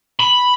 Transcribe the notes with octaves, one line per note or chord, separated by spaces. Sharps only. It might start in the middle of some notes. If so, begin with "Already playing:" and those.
B5